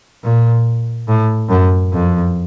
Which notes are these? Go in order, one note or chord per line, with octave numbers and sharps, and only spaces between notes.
A#2
A2
F#2
F2